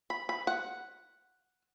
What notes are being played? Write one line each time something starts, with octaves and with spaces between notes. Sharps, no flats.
B5
B5
F#5